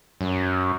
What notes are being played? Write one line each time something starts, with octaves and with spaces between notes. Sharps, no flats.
F#2